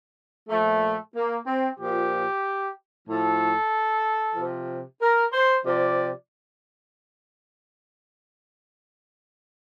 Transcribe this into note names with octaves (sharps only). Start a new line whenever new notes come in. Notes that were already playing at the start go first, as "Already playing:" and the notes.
A#2 F3 A3
A#3
C4
A#2 F3 G4
A2 F3 A4
C3 F3
A#4
C5
C3 F3 D5